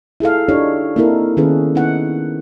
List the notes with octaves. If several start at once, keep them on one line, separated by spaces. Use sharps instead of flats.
E4 G#4 A4 F5
D4 D#4 G4 A4 C#5
A#3 C4 D#4 E4 A4 A#4
D#3 B3 C#4 G#4 A4 B4
B3 D#4 E4 F#5